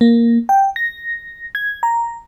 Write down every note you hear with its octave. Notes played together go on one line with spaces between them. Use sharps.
A#3
G5
A#6
G#6
A#5